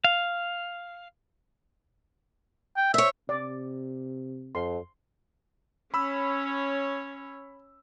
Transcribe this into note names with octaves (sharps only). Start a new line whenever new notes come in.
F5
G5
C5 C#5 E5
C3 D5
F2 C6
C#4 C#5 B5 E6